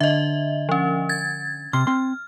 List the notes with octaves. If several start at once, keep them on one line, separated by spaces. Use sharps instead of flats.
D3 D#5 E5
F3 C#4
G#6 A6
C3 C6 F6
C4 C6